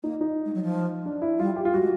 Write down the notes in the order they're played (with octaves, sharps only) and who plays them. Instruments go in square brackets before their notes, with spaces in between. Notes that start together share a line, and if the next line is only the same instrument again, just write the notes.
[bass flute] A#3 [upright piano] D#4
[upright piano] D#4
[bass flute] G#3
F#3
F3
[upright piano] D4
E4
[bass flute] G3 [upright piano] F4
[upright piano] G4
F4
[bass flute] G3 [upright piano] F#4
[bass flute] G#3